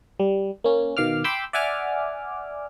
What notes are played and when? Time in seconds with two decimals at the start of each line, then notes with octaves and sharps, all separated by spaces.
0.19 G3
0.64 A#3 C#4
0.97 B2 D#3 F5 D6 F6
1.24 G5 B5 C6 D6 E6 G6
1.53 D5 E5 F#5 G#5 D6 F6